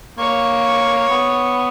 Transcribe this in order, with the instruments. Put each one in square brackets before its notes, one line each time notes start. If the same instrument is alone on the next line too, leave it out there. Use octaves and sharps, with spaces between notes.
[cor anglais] A#3 [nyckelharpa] C#5
[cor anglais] B3